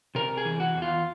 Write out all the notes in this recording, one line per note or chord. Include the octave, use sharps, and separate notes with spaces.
C3 A#4
G#4
E3
F#4
E2
F4